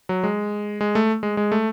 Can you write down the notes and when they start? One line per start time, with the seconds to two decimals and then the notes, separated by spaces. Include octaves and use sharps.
0.09 F#3
0.24 G#3
0.81 G#3
0.95 A3
1.23 G#3
1.37 G#3
1.52 A3